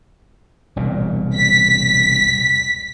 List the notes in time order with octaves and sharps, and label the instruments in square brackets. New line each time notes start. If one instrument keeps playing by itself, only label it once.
[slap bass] E1 C2 A#2
[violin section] B6